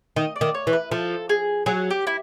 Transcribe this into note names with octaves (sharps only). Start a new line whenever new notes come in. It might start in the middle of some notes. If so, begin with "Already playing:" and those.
D#3 D#5
D5
D#3
C#5
E3
B4
F3 A4
G#4
F#3 G#4
G4
E4